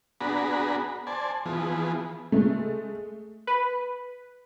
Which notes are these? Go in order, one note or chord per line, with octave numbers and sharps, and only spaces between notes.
B3 D4 F#4 G#4 A#5 B5
C5 D5 G#5 A5
E3 F3 B3 G#4
G#3 A3
B4